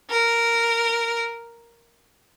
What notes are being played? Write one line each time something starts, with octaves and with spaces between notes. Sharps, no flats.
A#4